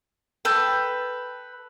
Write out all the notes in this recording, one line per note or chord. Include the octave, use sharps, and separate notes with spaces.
A4 B4 G5